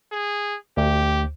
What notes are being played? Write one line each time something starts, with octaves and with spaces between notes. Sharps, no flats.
G#4
D2 G4